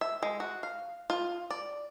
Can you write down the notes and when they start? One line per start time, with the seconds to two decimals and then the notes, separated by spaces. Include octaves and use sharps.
0.01 E5
0.23 G#3
0.40 F#4
0.63 F5
1.10 F4
1.50 D5